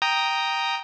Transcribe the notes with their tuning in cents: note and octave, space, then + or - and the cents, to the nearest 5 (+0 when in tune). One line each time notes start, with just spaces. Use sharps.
G5 +0 A#5 +0 D#6 +0